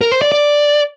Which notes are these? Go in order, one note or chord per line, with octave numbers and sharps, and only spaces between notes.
A#4
C5
D5
D5